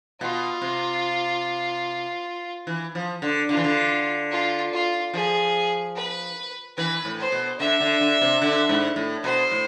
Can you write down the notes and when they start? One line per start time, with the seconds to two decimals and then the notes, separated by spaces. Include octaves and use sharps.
0.21 B2 F4
0.62 C3
2.67 E3
2.95 F3
3.22 D3
3.49 D3 F4
3.57 E3
3.64 D3
4.31 F4
4.73 F4
5.14 F3 G#4
5.95 B4
6.77 E3 B4
7.05 A2
7.19 C5
7.32 B2
7.59 D3 E5
7.80 D3
8.01 D3
8.22 C3
8.42 D3
8.69 G#2
8.96 A2
9.23 B2 C5
9.52 A2